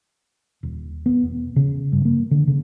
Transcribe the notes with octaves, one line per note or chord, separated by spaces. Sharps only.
D#1
B3
E1
C#3
G2
A#3
D3
C#3